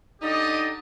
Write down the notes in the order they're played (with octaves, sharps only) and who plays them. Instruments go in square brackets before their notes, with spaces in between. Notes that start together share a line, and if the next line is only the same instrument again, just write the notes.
[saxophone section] D3 D#4 [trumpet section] G4 D5 D#5